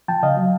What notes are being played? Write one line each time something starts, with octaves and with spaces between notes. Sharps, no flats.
F3 G5 A5
C#3 D#5 F5
F#3